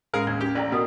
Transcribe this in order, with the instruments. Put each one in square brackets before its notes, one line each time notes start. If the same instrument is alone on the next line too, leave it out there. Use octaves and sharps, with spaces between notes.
[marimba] A2 G#3 C#4 [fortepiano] G#4 A#4 F5
[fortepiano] D#2 [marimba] G#6
[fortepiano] G4 G5
[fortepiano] A1 [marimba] D5 G5 A#5
[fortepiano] B2 [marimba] F#4 A#4 D#6